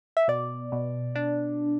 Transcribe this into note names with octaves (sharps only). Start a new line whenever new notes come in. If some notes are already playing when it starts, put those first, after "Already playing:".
E5
B2 D5
B2
D4